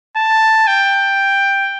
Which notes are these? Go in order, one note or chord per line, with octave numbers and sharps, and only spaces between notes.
A5
G5